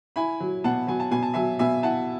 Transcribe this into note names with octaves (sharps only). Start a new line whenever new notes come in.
E4 G#5 B5
F#3
B2 F#5 A5
F#3 G#5
A5
B2 G#5
A5
F#3 E5 G#5
B2 E5 G#5
E4 F#5 A5